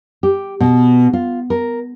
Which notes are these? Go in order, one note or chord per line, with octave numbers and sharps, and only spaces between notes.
G4
B2
F4
A#4